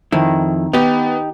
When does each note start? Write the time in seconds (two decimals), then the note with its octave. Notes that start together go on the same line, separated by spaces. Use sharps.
0.12 F2 D#3 E4
0.73 B3 D#4 G4